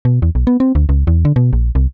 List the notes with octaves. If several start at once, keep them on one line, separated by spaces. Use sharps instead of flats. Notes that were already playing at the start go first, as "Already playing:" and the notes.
B2
E2
B1
B3
C4
D2
C#2
E2
D3
B2
A#1
C2